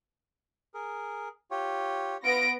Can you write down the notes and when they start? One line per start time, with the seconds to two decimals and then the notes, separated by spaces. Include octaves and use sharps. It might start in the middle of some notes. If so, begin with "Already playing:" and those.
0.74 G#4 A#4
1.51 F4 G4 C#5
2.23 B3 F4 A#6 D7